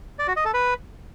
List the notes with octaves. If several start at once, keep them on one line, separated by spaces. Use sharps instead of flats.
D5
F#4
D#5
A4
B4